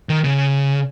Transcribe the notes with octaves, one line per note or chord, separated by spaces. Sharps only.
D#3
C#3